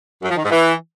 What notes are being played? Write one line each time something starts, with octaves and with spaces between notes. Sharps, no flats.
F#2
F3
D#3
G#2
E3